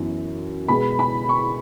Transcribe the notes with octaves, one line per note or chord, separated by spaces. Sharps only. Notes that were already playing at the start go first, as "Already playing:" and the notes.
Already playing: F#2 E3 B3
B2 G#3 B3 B5
B5
C#6